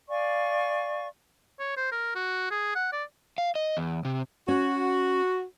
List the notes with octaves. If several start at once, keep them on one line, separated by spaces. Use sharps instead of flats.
D5 F5 G#5 C#6
C#5
C5
A#4
F#4
G#4
F#5
D5
F5
D#5
E2
C3
C#4 F#4